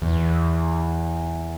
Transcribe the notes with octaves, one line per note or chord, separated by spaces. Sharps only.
E2